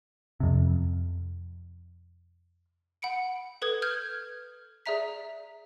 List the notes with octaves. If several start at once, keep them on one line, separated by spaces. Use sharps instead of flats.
F2 C3
F#5 B5 C#7 D7
A4 B4 D#6 G#6
F6 G6 G#6
G#4 D5 E5 A#5 B6